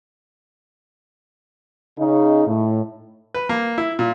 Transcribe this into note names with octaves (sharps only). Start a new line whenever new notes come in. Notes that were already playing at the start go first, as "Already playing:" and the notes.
C#3 D#4
A2
B4
A#3
E4
A#2